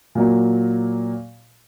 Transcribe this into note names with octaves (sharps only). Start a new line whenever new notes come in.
A#2 F#3 A#3